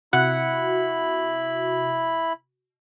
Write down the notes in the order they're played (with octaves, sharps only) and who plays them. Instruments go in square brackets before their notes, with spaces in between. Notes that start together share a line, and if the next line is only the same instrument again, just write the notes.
[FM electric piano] C3 F#4 [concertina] E4 B5 [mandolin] F#5